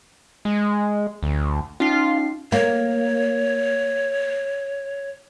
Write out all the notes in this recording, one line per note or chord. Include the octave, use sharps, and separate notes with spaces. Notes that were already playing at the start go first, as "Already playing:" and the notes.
G#3
D2
C#4 D#4 F4 C7
A#3 C#5